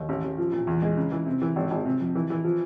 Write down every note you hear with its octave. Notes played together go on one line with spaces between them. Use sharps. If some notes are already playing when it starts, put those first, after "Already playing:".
Already playing: D#2
A1
A1
F3
A#2
E2
G#3
C#3
E3
C3
E3
G#1
G#1
C3
F2
E3
E3
F3